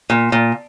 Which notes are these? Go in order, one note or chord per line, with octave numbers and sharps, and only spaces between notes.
A#2
A#2